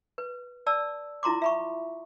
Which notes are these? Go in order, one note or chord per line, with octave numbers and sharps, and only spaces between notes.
B4
D5 A5 E6
E4 F4 A#5 C6 D6
E5 B5 C#6